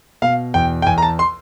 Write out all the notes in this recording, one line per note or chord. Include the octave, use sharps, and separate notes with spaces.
B2 F5
E2 G5
G5
E2 G#5
A#5
A5
C6